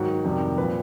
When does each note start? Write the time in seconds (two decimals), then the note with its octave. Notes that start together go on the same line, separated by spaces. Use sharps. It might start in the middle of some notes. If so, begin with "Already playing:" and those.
Already playing: G#2 D#3 F#3 F#4
0.25 F2 C3 D#3 G3
0.58 A#2 F3 B4